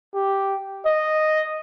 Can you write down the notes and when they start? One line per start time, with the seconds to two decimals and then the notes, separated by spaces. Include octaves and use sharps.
0.14 G4
0.86 D#5